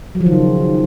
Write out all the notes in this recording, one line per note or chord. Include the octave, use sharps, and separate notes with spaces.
F#3
F3
D#3
C#3